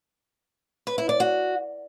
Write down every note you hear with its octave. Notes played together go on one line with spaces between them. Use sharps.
B4
E4
D5
F#4